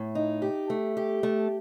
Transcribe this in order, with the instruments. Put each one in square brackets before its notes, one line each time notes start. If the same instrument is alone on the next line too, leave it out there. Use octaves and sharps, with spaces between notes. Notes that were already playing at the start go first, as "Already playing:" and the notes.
Already playing: [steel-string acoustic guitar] A2
D#4
G4
A3
G4
A3